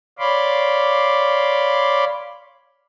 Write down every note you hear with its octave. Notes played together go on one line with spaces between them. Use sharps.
C#5 D5 F5 B5 C6 D6